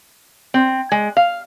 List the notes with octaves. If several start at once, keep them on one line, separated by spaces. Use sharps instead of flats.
C4
G#3
F5